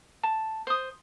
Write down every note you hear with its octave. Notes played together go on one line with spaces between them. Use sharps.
A5
C5 D#6